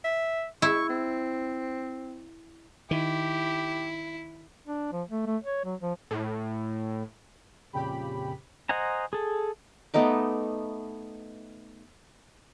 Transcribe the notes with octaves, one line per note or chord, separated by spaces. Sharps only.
E5
E4 C#6
C4
D#3 E4 G4
D4
F3
A3
A3
C#5
F#3
F3
A2
F2 A#2 C#3 G4 B5
C5 D#5 F#5 G#5 A#5
G#4 A4
A3 B3 D#4 D6